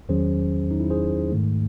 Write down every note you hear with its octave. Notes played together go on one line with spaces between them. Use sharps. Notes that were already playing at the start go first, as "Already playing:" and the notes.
E2 D#3 F#3 C#4 G#4 C5
D#4
E4
G#4 C5
G#2 D#3 A3